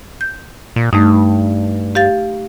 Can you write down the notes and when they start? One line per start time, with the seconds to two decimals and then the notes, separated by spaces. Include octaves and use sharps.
0.21 G6
0.76 A#2
0.93 G2 A3 D#4
1.95 G4 F5 A6